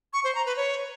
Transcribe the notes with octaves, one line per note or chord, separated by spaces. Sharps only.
C#6
C5
A#5
B4
C#5